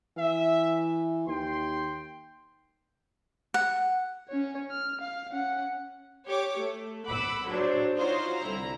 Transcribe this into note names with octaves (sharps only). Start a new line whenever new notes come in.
E3 E5
D#2 G5 C6
F#5
C#4 C#5
F6
F5
C#4 F#5
G4 C#5 D6
A3
F#5 B5 D6 E6
A#1 F#3 D4 C5
D#4 F4 F#4 C5 C#5
C2 D3 E4 A#5